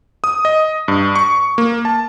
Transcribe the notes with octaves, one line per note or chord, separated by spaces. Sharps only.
D#6
D#5
G2
C#6
A#3
A5